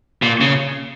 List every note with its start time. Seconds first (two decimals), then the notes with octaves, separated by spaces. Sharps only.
0.22 A#2
0.41 C#3